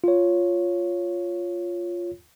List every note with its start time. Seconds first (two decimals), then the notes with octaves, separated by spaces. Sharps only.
0.04 F4 C#5